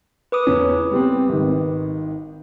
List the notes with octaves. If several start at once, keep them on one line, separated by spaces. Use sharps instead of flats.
B4 D6 D#6
E2 C#4
G3 B3 C4
G#1 D#3